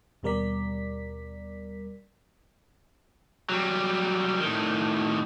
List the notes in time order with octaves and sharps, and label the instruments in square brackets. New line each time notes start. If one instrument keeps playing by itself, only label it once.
[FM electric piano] D#2 B2 G3 A#4 D5 B6
[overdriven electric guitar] F#3 G3
A2 D#3